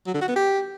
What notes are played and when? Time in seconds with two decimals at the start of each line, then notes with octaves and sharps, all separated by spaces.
0.07 F#3
0.14 D3
0.21 F#4
0.28 B3
0.36 G4